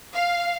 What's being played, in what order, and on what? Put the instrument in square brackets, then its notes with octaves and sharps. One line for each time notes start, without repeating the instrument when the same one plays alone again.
[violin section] F5